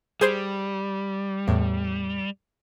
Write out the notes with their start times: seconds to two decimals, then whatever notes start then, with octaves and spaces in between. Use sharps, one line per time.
0.21 G3 G#4 C5 C6
1.48 E2 A2